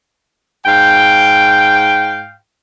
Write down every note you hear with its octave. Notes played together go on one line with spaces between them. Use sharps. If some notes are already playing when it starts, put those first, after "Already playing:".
G#2 F5 G5